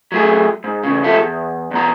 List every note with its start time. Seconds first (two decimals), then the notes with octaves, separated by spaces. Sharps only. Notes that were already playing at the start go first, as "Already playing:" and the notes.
0.12 F#3 A3 G#4
0.64 G#2
0.83 E2 C#3
1.03 D#2 G#2 F3 G4 A4 E5
1.20 E2
1.71 E2 B2 A#5